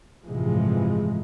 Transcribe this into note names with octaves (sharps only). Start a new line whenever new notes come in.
A1 G2 C3 E3 F3 G#3